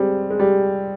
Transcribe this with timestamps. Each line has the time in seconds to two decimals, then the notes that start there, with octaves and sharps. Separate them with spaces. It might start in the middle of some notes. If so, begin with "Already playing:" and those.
Already playing: G3 G#3 C4
0.30 G#3
0.40 G3